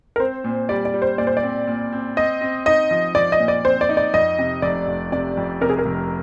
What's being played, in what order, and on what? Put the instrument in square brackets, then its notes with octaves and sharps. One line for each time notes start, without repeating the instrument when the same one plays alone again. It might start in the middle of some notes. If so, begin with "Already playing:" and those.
[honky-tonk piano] A#4
[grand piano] C4 [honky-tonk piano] C5
[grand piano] A#2
[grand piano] G3 [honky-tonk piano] D5
[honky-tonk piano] D5
[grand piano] G3
[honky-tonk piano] C5
[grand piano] A#2 [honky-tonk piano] D5
[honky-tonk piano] C5
D5
[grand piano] C4
A#2
C4
[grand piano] C4 [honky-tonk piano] D#5
[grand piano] C4
[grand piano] D#4 [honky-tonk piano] D#5
[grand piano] F3
[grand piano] F3 [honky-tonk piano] D5
[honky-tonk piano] D#5
[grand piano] A#2
[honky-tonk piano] D5
[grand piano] C4 [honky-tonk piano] C5
[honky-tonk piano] D5
[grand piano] D#4
[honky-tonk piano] D5
[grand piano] F2 [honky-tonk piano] D#5
[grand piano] C3
[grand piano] F1 [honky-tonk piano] D5
[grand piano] F1
[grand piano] C3 [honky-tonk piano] D5
[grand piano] F2
[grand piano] C3 [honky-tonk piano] A#4
[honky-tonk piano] G#4
A#4
[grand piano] F1